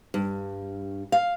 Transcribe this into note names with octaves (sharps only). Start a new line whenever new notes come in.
G2
F5